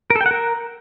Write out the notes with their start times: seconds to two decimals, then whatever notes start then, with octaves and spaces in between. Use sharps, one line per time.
0.10 A#4
0.16 A4
0.21 G5
0.26 F#5
0.31 A#4